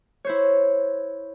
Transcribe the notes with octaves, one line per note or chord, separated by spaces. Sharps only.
E4 C5 C#5